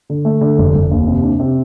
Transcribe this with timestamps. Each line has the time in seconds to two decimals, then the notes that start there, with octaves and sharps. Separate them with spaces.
0.10 D3
0.25 A3
0.41 D3
0.58 F1
0.75 F1
0.91 D#2
1.07 C3
1.23 D4
1.39 C3